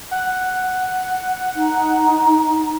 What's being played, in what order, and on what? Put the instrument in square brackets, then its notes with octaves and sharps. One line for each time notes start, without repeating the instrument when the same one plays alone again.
[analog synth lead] F#5
[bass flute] D#4